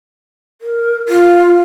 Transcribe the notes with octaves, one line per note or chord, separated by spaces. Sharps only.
A#4
F4